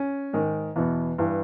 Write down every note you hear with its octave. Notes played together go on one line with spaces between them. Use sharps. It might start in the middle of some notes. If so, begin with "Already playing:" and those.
Already playing: C#4
G#2 D#3
E2 B2
G2 E3